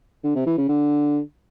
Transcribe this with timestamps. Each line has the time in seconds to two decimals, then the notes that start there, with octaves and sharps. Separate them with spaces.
0.24 D3
0.35 C3
0.46 E3
0.57 C#3
0.68 D3